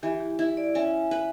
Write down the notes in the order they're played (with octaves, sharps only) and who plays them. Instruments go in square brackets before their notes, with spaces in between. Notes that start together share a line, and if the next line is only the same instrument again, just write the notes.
[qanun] E3 [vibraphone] G4
[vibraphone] G4
[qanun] E4 [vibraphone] G4
[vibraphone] D5
[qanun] C#4 [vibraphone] E5
[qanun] B4